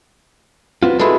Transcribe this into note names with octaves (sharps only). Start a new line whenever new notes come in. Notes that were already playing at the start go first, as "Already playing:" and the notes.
B3 C4 F4
G#3 E4 F#4 A4 B4